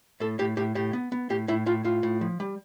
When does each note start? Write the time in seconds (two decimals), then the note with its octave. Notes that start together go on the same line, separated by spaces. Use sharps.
0.20 A2 A4
0.39 A2 G4
0.57 A2 G4
0.75 A2 G4
0.93 B3
1.12 B3
1.30 A2 G4
1.48 A2 E4
1.66 A2 F4
1.84 A2 F4
2.03 A2
2.21 F3
2.40 G3